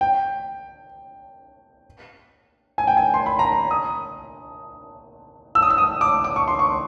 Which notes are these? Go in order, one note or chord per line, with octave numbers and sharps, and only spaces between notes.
G5
G#5
G5
G#5
C6
B5
A#5
D#6
E6
D#6
E6
D#6
D6
D6
C#6
C6
C#6